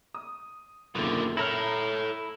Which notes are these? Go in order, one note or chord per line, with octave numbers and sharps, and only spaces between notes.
D#6
F#1 D#2 B2 D3 F4 F7
E4 A4 C#5 A#5 F6 A#6